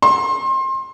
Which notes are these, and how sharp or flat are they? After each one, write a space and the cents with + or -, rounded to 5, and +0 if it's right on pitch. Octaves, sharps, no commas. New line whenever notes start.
C6 +30